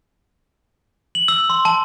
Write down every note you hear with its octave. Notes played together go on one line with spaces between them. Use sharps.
F#7
E6
C6
A5